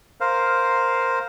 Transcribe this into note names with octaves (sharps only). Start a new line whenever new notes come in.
A#4 C5 F5